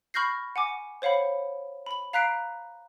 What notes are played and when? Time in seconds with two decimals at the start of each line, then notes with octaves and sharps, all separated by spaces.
0.14 B5 C#6 F6 G6 A#6 C7
0.56 F#5 G#5 D6
1.02 C5 C#5 F5 F#5 B5
1.86 B5 F#7
2.13 F5 A#5 F#6 B6 C7 D7